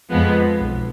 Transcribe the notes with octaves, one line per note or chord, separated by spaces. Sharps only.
F2 F3 G#3 B3
B1